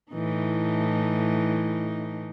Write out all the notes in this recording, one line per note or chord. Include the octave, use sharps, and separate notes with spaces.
A2 E3 D#4